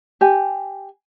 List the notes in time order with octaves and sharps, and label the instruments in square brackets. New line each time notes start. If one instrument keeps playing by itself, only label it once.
[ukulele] G4 G#5